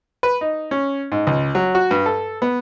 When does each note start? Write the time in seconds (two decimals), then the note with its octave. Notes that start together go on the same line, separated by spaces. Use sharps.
0.23 B4
0.41 D#4
0.71 C#4
1.12 G#2
1.27 C#2
1.55 F#3
1.75 F#4
1.91 G2
2.06 A4
2.42 B3